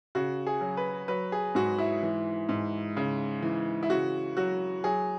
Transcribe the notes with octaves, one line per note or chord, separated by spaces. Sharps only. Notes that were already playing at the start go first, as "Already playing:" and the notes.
C#3 F#4
G#4
F#3
B4
F#3 B4
G#4
G#2 F#4
E4
E3
G#2
C#3
E3
E4
C#3 F#4
F#3 F#4
F#3 G#4